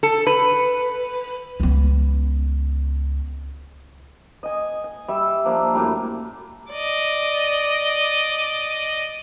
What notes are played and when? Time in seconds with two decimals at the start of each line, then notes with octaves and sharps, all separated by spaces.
0.03 A4
0.27 B4
1.60 C#2 B3
4.43 D#5 G#5
4.84 G#5
5.08 G3 E5
5.45 F3 A#3 D4
5.74 F#2 A2 G3
6.71 D5 D#5